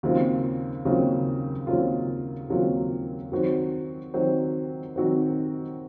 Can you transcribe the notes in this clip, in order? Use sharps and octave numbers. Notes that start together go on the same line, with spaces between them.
D#2 C#3 F#3 C4 F4
D#2 C#3 F#3 C4 F4
D#2 C#3 F#3 C4 F4
D#2 C#3 F#3 C4 F4
D#3 F#3 C4 F#4 C5
D#3 F#3 C4 F#4 C5
D#3 F#3 C4 F#4 C5